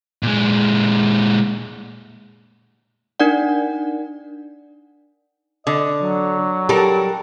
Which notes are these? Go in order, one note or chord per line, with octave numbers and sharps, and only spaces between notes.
A#2 G#3
D4 D#4 A#4 D5 F#5
D3 D#5
F#3
G3 A4 A#4